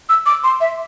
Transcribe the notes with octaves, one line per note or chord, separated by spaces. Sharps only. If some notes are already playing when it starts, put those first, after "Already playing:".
E6
D6
C6
E5